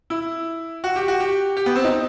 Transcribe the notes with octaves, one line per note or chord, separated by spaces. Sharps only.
E4
F#4
G4
F#4
G4
G4
B3
C4
D#4